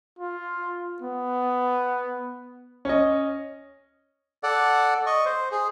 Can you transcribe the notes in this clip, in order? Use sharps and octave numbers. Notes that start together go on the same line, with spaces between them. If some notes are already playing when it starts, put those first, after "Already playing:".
F4
B3
C#4 D#5
A4 D5 F#5
D#5 C#6
C5
G#4